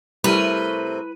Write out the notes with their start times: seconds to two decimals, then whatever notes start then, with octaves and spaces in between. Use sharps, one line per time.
0.24 C3 G3 A3 E4 A#4 B4 D#7